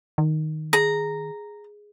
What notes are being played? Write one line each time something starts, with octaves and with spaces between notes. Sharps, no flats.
D#3
G#4 A#5